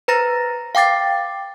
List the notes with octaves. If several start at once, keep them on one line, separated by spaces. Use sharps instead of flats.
B4 C5 A#5 A6 A#6
F5 G5 D6 A6 C7